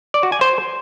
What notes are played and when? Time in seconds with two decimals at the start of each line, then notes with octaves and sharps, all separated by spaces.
0.14 D5
0.23 F#4
0.32 G#5
0.41 C5